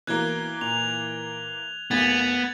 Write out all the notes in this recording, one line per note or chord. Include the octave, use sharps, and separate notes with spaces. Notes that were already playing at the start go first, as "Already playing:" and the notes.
B2 E3 A#3 F#6 G#6 G7
A#2 F7
F1 B1 A#3 B3 G#6 A6 F7